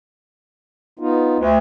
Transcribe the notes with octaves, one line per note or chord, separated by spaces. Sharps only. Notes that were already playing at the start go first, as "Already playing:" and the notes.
B3 D#4 F4
D2